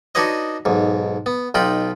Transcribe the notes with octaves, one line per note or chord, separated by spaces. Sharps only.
D4 D#4 F#4 B4 C#5 D#5
B1 G#2
B3
B1 D#4 F4 G5 B5